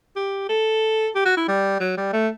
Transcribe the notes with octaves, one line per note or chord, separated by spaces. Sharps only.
G4
A4
G4
F#4
E4
G3
F#3
G3
A3